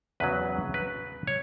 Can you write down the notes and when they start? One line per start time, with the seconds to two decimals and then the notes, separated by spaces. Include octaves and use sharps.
0.20 E2 C#3 F#3 B4
0.74 B4
1.27 C#5